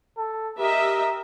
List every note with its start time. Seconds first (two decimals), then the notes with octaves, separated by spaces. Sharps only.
0.18 A4
0.59 G4 A#4 D#5 E5